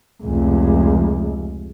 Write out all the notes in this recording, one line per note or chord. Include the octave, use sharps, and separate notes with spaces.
F1 C#2